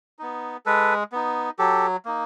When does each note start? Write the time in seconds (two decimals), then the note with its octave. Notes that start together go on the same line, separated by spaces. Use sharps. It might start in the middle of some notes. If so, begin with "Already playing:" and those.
0.19 B3 D#4
0.66 G#3 A4 B4
1.12 B3 D#4
1.59 F#3 G4 A4
2.05 A#3 D#4